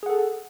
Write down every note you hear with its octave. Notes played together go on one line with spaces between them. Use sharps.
G#4 A4 F#5